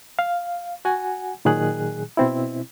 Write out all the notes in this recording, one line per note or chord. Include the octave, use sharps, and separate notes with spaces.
F5
F#4 F#5 G#5
A#2 D#3 F#3 G#4 F#6
B2 C4 E4